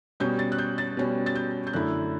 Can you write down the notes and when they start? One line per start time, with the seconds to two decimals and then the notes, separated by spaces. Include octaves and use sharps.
0.20 B2 G3 C#4 G6
0.39 A6
0.52 F#6
0.58 G6
0.78 A6
0.97 B2 G3 C#4
1.26 A6
1.35 G6
1.67 G6
1.73 F#2 D3 A3 E4 F#6